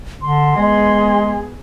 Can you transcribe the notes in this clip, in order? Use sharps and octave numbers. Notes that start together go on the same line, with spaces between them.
D3 C6
G#3 B3 G#4